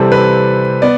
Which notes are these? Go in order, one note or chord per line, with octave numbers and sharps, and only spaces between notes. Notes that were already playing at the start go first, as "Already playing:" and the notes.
Already playing: C3 E3 G3 C4 A4
B4
B3 D5